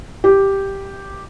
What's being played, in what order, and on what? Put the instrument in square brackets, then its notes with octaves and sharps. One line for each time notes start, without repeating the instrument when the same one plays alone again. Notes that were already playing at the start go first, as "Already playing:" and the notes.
[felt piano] G4